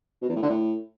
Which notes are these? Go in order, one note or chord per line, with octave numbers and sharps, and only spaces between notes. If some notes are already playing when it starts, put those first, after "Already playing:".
B2
E2
A2
D3
A2